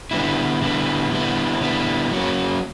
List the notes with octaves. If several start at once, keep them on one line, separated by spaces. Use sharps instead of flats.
D3 G3 B3 E4
D3 G3 B3 E4
D3 G3 B3 E4
D3 G3 B3 E4
F#3 A#3 C#4